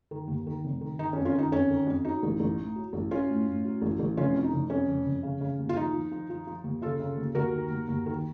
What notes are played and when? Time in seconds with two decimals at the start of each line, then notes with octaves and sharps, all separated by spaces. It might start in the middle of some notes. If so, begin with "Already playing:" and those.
0.11 D#3
0.28 D#2
0.47 D#3
0.64 F1
0.81 D#3
0.99 D#3 D#4
1.13 C#4
1.17 F2
1.25 C#4 F4
1.35 D#3 D#4
1.52 F2 C#4
1.70 D#3
1.87 F2
2.05 F#3 D#4
2.23 A1
2.40 A1
2.58 A2
2.76 F#3
2.93 A1
3.11 F#3 C#4 F4
3.29 A2
3.47 A2
3.65 F#3
3.82 A1
3.99 A1
4.17 F1 C#4 F4
4.35 F2
4.44 D#4
4.53 F1
4.70 F2 C#4
4.88 F1
5.05 F1
5.23 C#3
5.41 C#3
5.59 D#2
5.69 F4
5.76 F3 D#4
5.94 F3
6.12 F3
6.30 F3
6.47 F3
6.64 D#2
6.82 C#3 F4 A4
7.00 C#3
7.17 D#2
7.35 D#2 F#4 A#4
7.52 D#3
7.71 D#2
7.88 D#2
8.06 D#3